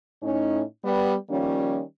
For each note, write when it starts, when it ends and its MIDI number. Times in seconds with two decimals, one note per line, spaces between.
0.23 0.62 45
0.23 0.62 61
0.23 0.62 63
0.84 1.14 55
0.84 1.14 59
1.29 1.82 51
1.29 1.82 53
1.29 1.82 55
1.29 1.82 58
1.29 1.82 61